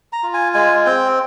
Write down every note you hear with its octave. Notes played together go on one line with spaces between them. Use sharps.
A#5
F4
G#5
G#3 G#5
C4 G5